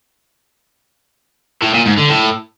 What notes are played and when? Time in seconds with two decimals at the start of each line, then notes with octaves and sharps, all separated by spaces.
1.62 A2
1.74 A#2
1.86 G#2
1.98 D3
2.09 A2